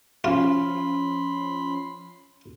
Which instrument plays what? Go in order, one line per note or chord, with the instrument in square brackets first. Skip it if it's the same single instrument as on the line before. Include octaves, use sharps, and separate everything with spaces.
[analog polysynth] F3 C#4 [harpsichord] F4 [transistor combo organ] B5 C6